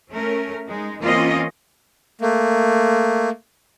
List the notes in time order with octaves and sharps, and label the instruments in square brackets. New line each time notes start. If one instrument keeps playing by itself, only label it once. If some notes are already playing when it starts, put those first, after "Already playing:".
[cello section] A3 C#4 A#4
G#3 D#4
E3 A#3 C4 C#4 F4 D#5
[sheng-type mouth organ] A3 A#3